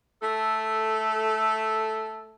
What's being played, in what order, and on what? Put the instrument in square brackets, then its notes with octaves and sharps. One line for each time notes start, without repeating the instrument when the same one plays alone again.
[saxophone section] A3 A4